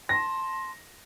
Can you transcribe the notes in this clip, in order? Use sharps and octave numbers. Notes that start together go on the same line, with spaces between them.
A5 C6 A#6